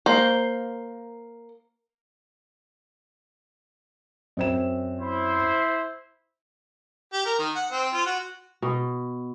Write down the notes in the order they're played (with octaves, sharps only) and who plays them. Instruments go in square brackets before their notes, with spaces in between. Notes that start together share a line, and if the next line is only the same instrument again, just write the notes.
[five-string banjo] A#3 C5
[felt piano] F#2 C4 E7
[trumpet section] E4 C5
[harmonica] G4
A#4
D#3
F#5
C4
F4
F#4
[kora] B2